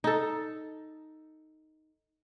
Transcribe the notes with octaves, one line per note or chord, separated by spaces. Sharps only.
D#4 A4